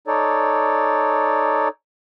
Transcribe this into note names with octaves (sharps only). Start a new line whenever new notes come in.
D#4 A4 C#5 D5